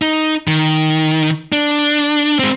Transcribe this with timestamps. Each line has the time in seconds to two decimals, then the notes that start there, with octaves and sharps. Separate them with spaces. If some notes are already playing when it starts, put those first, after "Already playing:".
0.02 D#4
0.48 D#3
1.52 D4
2.39 G#3 C4